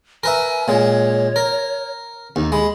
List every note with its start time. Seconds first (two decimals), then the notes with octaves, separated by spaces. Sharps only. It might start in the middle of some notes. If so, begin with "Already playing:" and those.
0.23 A#4 B4 E5 G#5
0.68 A#2 G#3 C#5
1.36 A#4
2.36 D#2 D#4
2.52 G#3 B5